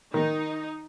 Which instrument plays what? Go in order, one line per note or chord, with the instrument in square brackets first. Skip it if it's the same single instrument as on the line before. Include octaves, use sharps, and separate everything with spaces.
[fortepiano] D#3 [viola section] D#4